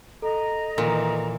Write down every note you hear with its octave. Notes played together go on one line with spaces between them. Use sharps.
A4 D#5 A#5
A#2 D#3 E3